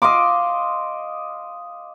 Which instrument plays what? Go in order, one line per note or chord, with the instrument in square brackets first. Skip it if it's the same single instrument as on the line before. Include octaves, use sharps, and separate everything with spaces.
[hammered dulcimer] D#5 F5 C6 D6